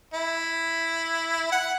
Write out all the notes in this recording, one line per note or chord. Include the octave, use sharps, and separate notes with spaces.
E4
F#5